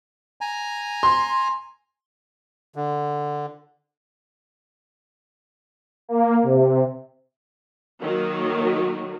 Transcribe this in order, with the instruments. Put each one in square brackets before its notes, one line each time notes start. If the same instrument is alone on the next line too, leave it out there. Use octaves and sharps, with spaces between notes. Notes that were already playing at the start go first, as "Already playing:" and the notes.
[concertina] G#5 A#5
[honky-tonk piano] C6
[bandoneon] D3
[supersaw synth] A#3
C3
[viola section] D#3 F#3 A#3